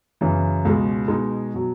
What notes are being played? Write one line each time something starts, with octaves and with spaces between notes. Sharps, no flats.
F#2 C#3 E3
C#2 B2 G#3
B2 G#3 D#4
B2 F#3